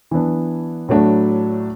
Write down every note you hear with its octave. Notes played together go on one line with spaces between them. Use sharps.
E3 B3 D4
A2 F#3 A3 D4 F#4